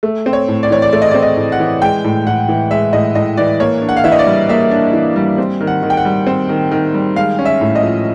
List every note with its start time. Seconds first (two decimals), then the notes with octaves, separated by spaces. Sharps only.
0.03 A3
0.26 C4
0.33 C#5
0.48 A2
0.63 D5
0.70 E3 C#5
0.82 D5
0.93 A3 D5
1.02 D#5
1.11 D5
1.15 C4
1.23 D#5
1.37 A2
1.52 F#5
1.59 E3
1.82 G#3 G5
2.04 A2
2.26 A2 F#5
2.48 E3
2.71 G#3 E5
2.93 A2 D#5
3.15 A2 D#5
3.37 E3 D5
3.60 A#3 C#5
3.82 D4
3.89 F#5
3.97 F5
4.04 E3 E5
4.12 D#5
4.19 D5
4.26 G3
4.49 A#3 E5
4.71 D4
4.93 E3
5.16 G3
5.38 C4
5.60 D#3
5.67 F#5
5.83 D#3
5.90 G5
5.97 F#5
6.05 G3
6.27 C4
6.49 D#3
6.71 D#3
6.94 G3
7.16 G#3 F5
7.39 C#4
7.45 E5
7.61 A2
7.76 D#5
7.83 F3